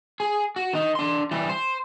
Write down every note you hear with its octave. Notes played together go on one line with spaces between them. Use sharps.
G#4
F#4
D#3 D#4
D4 C6
E3 G3
C5